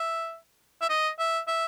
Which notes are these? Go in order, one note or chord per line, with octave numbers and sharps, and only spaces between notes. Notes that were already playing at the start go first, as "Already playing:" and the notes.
Already playing: E5
E5
D#5
E5
E5